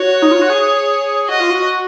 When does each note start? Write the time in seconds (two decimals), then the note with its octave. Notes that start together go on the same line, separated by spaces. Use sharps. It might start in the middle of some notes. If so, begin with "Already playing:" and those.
Already playing: F#4 C#5
0.22 D#4
0.32 F4
0.41 F#4
0.50 G#4
1.29 F#4 D#5
1.40 F4
1.50 F#4